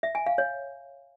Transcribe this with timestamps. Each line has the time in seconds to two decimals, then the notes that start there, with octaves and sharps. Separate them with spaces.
0.03 E5
0.15 G#5
0.26 F5
0.38 C#5